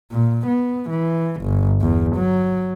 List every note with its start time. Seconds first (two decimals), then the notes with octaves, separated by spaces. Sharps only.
0.12 A#2
0.47 B3
0.90 E3
1.42 G1
1.81 E2
2.16 F#3